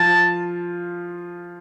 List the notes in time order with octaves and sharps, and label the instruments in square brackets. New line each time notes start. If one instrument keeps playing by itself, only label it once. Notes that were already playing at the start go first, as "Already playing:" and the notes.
Already playing: [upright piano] F3 F4 [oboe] A5